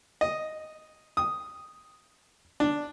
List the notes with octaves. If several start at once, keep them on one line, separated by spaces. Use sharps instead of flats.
D#5
D#6
D4